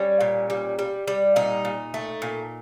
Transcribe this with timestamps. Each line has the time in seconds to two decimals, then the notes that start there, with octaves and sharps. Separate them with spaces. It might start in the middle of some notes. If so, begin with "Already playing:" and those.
Already playing: G3 C#4
0.20 A#2
0.50 G3
0.79 G3
1.08 G3
1.36 A#2 D#4
1.65 A#2
1.94 A3
2.22 A#2